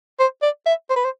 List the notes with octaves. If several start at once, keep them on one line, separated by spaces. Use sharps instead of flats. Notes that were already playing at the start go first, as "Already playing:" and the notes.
C5
D5
E5
C5
B4
C5